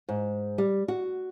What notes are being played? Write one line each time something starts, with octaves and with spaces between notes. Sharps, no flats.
G#2
G3
F#4